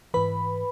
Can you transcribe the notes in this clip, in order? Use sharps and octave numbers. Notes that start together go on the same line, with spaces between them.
G#2 E3 B4 B5